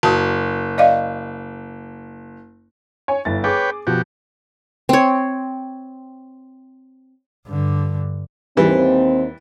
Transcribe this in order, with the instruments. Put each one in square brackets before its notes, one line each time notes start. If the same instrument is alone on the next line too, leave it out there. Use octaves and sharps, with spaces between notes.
[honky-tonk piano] F#1 [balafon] F#4 A5
[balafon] D5 D#5 F5
[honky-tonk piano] C#5 G#5
G1 E4 A6
[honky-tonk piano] G#4 D6 [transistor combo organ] B4 C#5 G5
[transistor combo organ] B2 F#4 G4 [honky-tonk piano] F3
[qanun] C4 C#5
[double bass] G2 D3
[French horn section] D#2 C4 [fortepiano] E3 G3